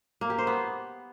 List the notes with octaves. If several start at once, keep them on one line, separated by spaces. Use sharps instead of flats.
A#3
G4
C5
B3